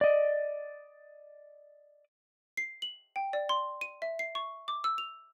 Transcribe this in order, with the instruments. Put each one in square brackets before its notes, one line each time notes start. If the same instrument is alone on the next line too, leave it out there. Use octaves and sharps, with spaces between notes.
[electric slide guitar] D5 D#5
[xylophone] C7
F#7
G5
D5
C6
D#7
E5
C7
C#6
D6
E6
F7